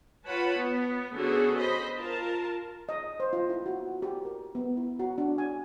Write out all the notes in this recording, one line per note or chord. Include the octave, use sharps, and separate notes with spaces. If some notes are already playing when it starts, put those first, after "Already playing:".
F4 B4 C#5 F#5 A5 B5
B3
D3 B3 C#4 F#4 G#4 A4
C5 D#5 B5
F4 A#4 A5
D#5
C5
F4
E4
F#4
G4
A#4
B3
E4
F#4
D4
G#5